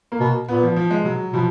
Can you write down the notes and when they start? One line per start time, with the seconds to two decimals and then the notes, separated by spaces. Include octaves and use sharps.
0.12 A#3
0.20 B2
0.48 A#2 B3
0.63 F3
0.76 F3
0.91 G#3
1.04 B2 F#3
1.33 B2 F3